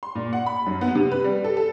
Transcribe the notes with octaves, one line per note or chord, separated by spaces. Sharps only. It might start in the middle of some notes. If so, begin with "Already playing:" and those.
C6
A#2
F#5
B5
F#2
B3
C3
B4
G3
A4
A4